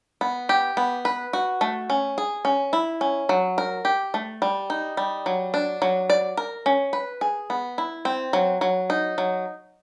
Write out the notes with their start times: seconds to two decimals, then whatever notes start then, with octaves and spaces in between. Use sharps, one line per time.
0.21 B3
0.49 G4
0.77 B3
1.05 B4
1.33 F#4
1.61 A3
1.90 C#4
2.18 G#4
2.45 C#4
2.73 E4
3.01 C#4
3.29 F#3
3.58 A#4
3.85 G4
4.14 A3
4.42 G3
4.70 D#4
4.97 G3
5.26 F#3
5.54 D4
5.82 F#3
6.10 D5
6.37 A#4
6.66 C#4
6.93 B4
7.21 G#4
7.50 B3
7.78 E4
8.05 C4
8.33 F#3
8.61 F#3
8.90 D#4
9.18 F#3